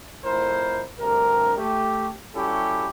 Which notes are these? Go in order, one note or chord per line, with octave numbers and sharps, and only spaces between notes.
F2 A2 E4 A#4 C5
D2 G2 C3 A#4
A3 G4
G3 C#4 E4 F#4 G4 A4